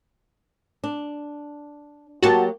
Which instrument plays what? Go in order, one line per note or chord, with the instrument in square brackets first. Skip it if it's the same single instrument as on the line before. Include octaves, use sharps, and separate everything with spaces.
[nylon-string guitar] D4
[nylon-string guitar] F#3 A#3 G4 [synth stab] F#4 A5